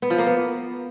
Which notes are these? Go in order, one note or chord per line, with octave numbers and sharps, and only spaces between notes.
B3
F3
A#3
B3